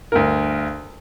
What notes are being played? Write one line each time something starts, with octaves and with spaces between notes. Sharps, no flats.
D2 G2 A#4